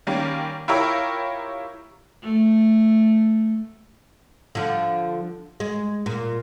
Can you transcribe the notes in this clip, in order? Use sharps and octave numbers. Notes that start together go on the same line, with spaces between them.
D#3 G3 A#3 C#4
E4 F4 G4 A#4 C#5 E5
A3
D3 F3
G#3
A#2